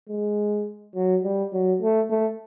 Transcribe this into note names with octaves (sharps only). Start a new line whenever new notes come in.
G#3
F#3
G3
F#3
A3
A3